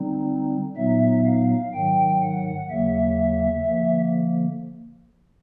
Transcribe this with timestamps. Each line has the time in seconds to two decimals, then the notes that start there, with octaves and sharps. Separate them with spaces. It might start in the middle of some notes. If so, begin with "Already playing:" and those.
Already playing: D3 G3 C4 D#4
0.76 A#2 F#3 B3 D#4 E5
1.26 F5
1.73 G#2 D#3 F#3 G5
2.22 F#5
2.70 D#2 C#3 F#3 A#3 E5
3.67 D3 F3 A#3